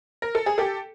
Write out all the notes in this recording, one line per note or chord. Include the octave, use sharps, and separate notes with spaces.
A#4
A4
G#4
G4 A4